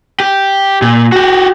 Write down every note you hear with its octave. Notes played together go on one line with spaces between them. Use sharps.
G4
A#2
F#4 G4